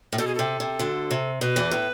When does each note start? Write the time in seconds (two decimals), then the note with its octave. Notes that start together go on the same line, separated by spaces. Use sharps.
0.12 A2
0.18 B2 A4
0.27 G#4
0.35 C3 A4
0.60 C3
0.79 D2 D3
1.11 C3
1.41 B2 B4
1.56 E2 E3
1.71 A2